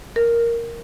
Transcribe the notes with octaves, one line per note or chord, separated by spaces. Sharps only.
A#4